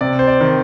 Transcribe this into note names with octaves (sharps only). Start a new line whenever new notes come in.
C3 D5
C5
D5
D#3